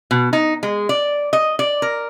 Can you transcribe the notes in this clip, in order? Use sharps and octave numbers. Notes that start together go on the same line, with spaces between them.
B2
D#4
G#3
D5
D#5
D5
A#4